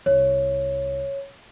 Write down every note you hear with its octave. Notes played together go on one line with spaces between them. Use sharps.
C2 C#5